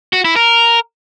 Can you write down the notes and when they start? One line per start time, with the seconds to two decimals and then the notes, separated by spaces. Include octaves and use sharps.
0.13 F#4
0.25 E4
0.36 A#4